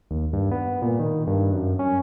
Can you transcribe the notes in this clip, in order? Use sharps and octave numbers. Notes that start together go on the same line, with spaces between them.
D#2
G2
B3
A#2
D#3
G2
F#2
C#4